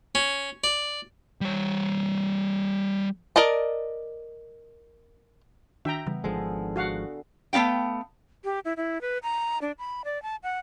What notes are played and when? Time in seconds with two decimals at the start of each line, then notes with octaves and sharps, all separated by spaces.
0.15 C#4
0.64 D5
1.41 G3 C#5
3.36 A#4 D5 D#5 A5
5.85 D#3 D4 F#4 E5 G5 A#5
6.07 C#3 E3 G3 B3
6.24 G#1 D3 F3 G#3 G#4 A4
6.76 F#4 F5 F#5
7.53 A3 B3 D#4 F5 G5
8.45 G4
8.65 E4
8.77 E4
9.01 B4
9.23 A#5
9.62 D4
9.79 B5
10.05 D5
10.23 A5
10.43 F#5